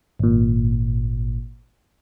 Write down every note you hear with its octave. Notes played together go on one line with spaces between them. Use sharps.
G#1 A#2